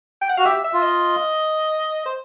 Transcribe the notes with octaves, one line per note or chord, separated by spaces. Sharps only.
G5
F#5
F#4 F5
G4 E5
E5
F4
D#5
C5